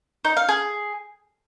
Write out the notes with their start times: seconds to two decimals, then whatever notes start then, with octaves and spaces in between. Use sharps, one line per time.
0.25 D#4
0.37 F5
0.49 G#4